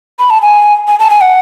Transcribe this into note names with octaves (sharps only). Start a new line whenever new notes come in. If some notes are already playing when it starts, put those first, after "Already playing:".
B5
A5
G#5
G#5
A5
G#5
F#5